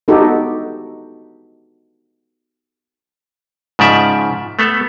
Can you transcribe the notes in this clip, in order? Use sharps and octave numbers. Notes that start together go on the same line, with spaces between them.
B3 D#4 F#4 G4 A4
G#2 C#3 F3 D5 E5
A3 B3 A4